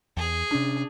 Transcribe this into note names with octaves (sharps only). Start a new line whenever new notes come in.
E2 G#4
C3 C#4 D4